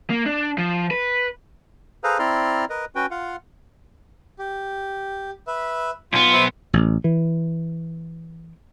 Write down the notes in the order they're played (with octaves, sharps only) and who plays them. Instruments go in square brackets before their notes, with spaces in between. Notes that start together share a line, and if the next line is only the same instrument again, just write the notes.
[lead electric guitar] A#3
D4
F3
B4
[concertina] G#4 A4 B4 C5 F5 A#5
C4 E4 D5 A#5 C6 F6
A#4 B4 D#5
C#4 F#4 B4 G5
F4 F5 F#5
[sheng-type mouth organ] G4
B4 E5
[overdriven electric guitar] B1 B3 [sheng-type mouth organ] F4
[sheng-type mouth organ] C5 E5 B5
[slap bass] A1
E3